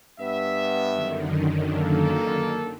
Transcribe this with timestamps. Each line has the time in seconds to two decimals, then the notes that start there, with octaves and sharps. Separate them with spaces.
0.20 G2 B3 E5
0.91 F#2 D3 D#3
1.77 A#3 A4